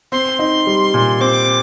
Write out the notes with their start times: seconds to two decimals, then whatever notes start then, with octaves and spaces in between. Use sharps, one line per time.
0.12 C4 C6
0.39 D#4
0.67 G3
0.94 A#2
1.21 C4 D6